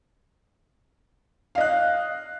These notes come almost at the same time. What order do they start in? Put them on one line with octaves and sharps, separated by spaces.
F5 D#5 F#6